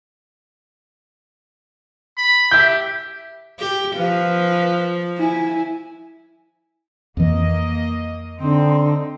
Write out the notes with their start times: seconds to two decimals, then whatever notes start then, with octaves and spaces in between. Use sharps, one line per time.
2.17 B5
2.51 G4 E5 G6
3.59 G4
3.97 F3 B4 F5
5.17 E4 G#5
7.17 F2 E3 A#3 D#5
8.39 D3 C4 D#4